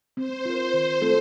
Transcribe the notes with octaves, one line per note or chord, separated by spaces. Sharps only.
C4 C5
F4 A#4
D#3
A3 C4 F4 A4